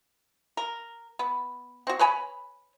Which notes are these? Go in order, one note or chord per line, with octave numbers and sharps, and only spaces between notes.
A#4
B3
C4 F#4
B4 C#5 G#5 B5